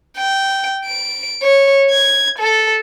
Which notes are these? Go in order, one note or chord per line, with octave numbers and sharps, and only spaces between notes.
G5
D7
C#5
G#6
A4